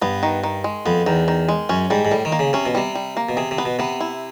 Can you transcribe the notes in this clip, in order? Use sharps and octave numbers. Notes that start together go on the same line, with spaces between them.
G2 B3
D#3
D#3
G#3
F2 B3
E2 D#3
D#3
G#3
F#2 C#4
G#2 G3
G#2
A2 G3
D#3
A#3
C#3
C3 C#4
B2
C3 G3
G3
A#3
B2
C3 G#4
C3
B3
B2
C3 B3
E4